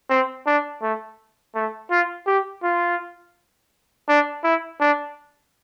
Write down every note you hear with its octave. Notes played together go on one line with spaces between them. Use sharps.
C4
D4
A3
A3
F4
G4
F4
D4
E4
D4